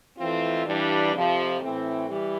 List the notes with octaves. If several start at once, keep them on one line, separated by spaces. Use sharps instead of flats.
F2 E3 A3 C4 F4
G2 E3 G3 D4
F2 C3 F3
A2 E3 A3 C4
E3 G3